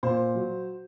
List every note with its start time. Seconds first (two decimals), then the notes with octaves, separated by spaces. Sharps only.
0.03 A#2 C5
0.35 F#3